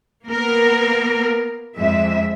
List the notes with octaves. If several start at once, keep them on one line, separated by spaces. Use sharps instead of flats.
A#3 B3 A#4
F2 G#3 E5